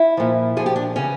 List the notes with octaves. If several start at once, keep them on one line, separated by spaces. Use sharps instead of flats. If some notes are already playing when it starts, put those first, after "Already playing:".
Already playing: E4
A#2 F3
A#2 F3 G#4
G4
D4
C#3 E3 C#4